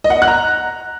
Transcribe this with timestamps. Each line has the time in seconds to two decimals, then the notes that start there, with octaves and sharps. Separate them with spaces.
0.04 D#5
0.10 F#5
0.16 D#5
0.22 F#6
0.28 A#5